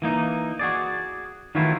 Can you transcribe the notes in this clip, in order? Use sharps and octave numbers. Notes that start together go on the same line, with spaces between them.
E3 A#3 D#4
F#4 G#4 D5
D#3 E3 F#3 A3 E4 F4